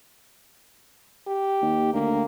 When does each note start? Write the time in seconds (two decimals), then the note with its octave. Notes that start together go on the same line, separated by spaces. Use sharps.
1.27 G4
1.62 D#2
1.93 D2 A#3